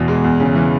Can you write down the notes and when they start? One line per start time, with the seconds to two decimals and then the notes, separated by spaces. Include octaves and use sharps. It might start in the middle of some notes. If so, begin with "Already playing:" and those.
Already playing: E2 B2 E3
0.08 G#3
0.24 E2
0.40 C#3
0.55 E3